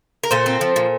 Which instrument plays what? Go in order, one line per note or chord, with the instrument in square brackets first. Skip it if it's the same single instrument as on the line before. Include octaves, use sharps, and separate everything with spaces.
[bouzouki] A#4
A#2 A4 C5
C4
F3
A#2